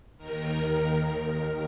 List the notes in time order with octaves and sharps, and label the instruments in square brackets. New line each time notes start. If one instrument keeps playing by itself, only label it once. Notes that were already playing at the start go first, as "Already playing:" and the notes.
[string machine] D#2 D#3 A#4